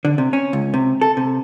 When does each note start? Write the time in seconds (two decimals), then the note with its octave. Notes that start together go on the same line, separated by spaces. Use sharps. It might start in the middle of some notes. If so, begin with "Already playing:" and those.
0.05 D3
0.18 C3
0.33 C#4
0.53 C#2
0.74 C3
1.01 A4
1.17 C3